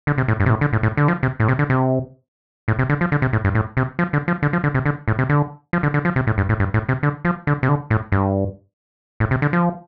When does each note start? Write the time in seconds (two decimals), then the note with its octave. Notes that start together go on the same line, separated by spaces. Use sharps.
0.07 D3
0.18 C3
0.28 A2
0.40 G2
0.46 C3
0.50 A2
0.61 D3
0.73 A2
0.83 A2
0.97 D3
1.08 F3
1.23 C3
1.40 A2
1.48 C3
1.59 D3
1.70 C3
2.68 A2
2.79 C3
2.89 D3
3.01 F3
3.12 D3
3.22 C3
3.33 A2
3.45 G2
3.55 A2
3.77 C3
3.99 F3
4.13 D3
4.28 F3
4.43 D3
4.53 F3
4.64 D3
4.74 C3
4.86 D3
5.08 A2
5.19 C3
5.29 D3
5.73 F3
5.83 D3
5.94 D3
6.05 F3
6.16 C3
6.27 A2
6.38 G2
6.49 A2
6.60 G2
6.74 A2
6.89 C3
7.03 D3
7.25 F3
7.47 D3
7.63 C3
7.69 D3
7.90 A2
8.12 G2
9.20 A2
9.31 C3
9.42 D3
9.53 F3